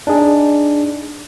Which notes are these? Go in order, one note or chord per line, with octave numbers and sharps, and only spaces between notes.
D4 D#4 G#4